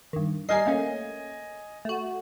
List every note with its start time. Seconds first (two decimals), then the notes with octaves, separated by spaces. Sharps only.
0.13 G2 D#3
0.49 G3 A#4 D#5 G#5 C7
0.66 A3 A#3 C#4
1.85 A3 F#4